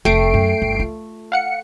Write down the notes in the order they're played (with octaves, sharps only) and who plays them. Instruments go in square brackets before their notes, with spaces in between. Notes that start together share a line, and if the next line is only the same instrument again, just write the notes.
[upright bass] F1 [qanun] A3 [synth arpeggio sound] G5 C7 D7
[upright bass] F#2
G1
F4
[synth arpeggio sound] F5 F#5 C#7